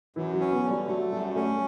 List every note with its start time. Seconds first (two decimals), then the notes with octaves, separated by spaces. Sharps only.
0.16 F#2 E3
0.34 F#3
0.40 C#4
0.52 B3
0.64 D3
0.70 G3
0.87 F#3 A3
1.12 F#2 G3
1.36 A3 C#4